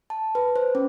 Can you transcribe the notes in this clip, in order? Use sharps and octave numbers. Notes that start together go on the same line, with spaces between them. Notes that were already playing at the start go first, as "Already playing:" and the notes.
A5
B4
C5
C#4